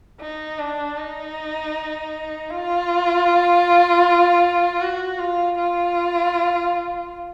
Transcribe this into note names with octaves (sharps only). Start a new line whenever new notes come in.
D#4
D4
D#4
F4
F#4
F4
F4